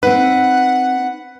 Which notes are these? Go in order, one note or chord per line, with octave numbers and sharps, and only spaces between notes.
C4 D#4 B4 F#5